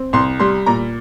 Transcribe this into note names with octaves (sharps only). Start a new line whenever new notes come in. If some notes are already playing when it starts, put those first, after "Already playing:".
Already playing: C4
C2 C6
G3 C6
A#2 A#5